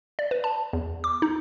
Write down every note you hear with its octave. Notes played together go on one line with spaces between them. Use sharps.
D5
B4
A5
E2
D6
D#4